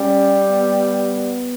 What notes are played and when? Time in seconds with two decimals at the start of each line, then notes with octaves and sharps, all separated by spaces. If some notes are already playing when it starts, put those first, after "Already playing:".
Already playing: G3 C#4
0.51 B3